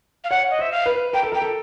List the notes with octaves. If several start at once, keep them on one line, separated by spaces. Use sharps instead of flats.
F5
C#5 F#5
D#5
C5 E5
F5
B4
A#4 G5
A4
A#4 G5
A4